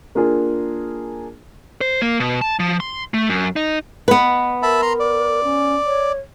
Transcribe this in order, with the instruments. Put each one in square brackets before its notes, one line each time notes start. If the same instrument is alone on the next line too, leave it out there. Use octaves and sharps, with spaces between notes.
[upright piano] A#3 D4 F4 G#4 A#4
[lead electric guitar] C5
A#3
B2
A5
F3
C6
A3
F#2
D#4
[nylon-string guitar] B3 B4 [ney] D#5
[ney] A#4 [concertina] E5 A5 B5
[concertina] A#5 C6
D5
[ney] C#4
C#5